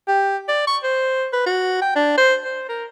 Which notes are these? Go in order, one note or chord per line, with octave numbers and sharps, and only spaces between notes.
G4
D5
C#6
C5
B4
F#4
G5
D4
C5
C5
A#4